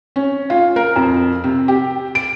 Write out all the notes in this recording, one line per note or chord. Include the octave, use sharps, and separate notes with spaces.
C#4
F4
A#4
F2
C3
G4
D7